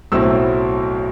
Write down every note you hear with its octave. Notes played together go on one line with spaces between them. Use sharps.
B1 A2 F#3 C4 E4 E6